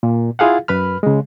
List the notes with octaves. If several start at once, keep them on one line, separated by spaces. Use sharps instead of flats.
A#2
E4 F4 G#4 F5 F#5
F#2 B4 B5 F6
C#3 G#3